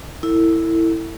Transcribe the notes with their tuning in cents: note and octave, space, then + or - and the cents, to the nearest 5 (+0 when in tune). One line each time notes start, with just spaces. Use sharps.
E4 +0 A4 +40